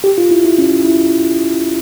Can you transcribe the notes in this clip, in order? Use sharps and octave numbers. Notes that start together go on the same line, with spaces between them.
G4
F4
E4
E4
C#4
E4